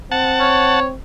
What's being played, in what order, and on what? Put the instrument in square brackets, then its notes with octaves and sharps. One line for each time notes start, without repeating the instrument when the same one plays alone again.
[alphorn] C4 [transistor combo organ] F#5 A5
[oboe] C#5